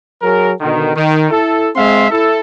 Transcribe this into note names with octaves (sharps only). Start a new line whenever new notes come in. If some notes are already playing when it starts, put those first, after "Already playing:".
F#3 G#4 A#4
B2 D3 D#3
D#3
E4 A4
G#3 C4 E5 F5 C6
E4 A4